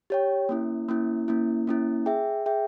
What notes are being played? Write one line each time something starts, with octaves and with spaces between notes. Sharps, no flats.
G4 C#5 G5
A#3 C#4 E4
A#3 C#4 E4
A#3 C#4 E4
A#3 C#4 E4
G#4 E5 G5
G#4 E5 G5